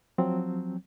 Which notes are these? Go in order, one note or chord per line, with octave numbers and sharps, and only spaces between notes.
F3 F#3 C4